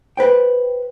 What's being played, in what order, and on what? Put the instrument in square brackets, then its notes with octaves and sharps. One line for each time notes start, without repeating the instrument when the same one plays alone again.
[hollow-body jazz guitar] B4 C5 G5